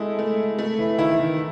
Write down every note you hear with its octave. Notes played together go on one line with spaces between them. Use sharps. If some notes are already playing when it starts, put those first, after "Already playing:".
Already playing: G#3 A3 E4 A4
A3
A3
E3
D#3 E4
E3
D#3